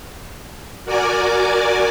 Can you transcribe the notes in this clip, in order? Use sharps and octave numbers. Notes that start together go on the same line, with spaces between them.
F#4 A#4 D5 G#5 D6